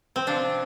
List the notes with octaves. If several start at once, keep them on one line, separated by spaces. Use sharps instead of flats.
C4
C3 F3 D4